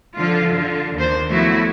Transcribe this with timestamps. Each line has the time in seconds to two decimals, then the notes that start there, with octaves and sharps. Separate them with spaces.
0.15 D3 F3 F4
0.52 D3 F4
0.94 D#2 D4 C5
1.27 F3 F#3 A3 B3 E4 F#4